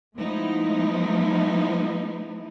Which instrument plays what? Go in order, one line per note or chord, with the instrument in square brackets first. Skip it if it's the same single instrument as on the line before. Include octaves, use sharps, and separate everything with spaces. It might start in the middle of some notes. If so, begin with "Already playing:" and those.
[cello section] F3 G#3 A3 B3 D#4 E4